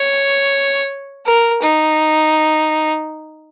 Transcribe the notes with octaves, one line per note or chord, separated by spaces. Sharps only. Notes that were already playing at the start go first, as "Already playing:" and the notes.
Already playing: C#5
A#4
D#4